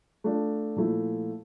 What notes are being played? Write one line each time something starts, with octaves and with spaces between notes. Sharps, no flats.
A3 D4 F4
A#2 F3 A3 E4